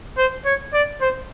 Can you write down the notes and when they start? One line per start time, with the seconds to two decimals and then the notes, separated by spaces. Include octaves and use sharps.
0.17 C5
0.45 C#5
0.73 D5
1.01 C5